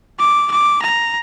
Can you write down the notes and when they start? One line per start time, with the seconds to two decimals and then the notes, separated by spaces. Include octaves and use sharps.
0.19 D6
0.51 D6
0.82 A#5